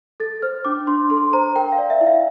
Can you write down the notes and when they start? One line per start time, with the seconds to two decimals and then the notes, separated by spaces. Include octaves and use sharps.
0.20 A4 A6
0.42 C5 F6
0.65 D4 D6
0.87 D4 C6
1.10 A4 C6
1.33 C5 A#5
1.55 A#4 G5
1.72 F5
1.78 D5
1.90 E5
2.01 E4
2.06 F5